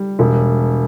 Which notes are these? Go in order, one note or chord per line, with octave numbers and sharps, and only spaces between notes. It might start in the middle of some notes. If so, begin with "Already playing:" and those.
Already playing: G3
E1